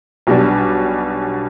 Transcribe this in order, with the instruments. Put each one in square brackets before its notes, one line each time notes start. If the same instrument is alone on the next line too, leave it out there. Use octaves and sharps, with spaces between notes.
[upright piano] B1 B2 G3 D4